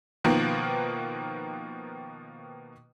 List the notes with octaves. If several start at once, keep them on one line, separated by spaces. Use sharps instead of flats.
B2 D#3 F3 A#3 B3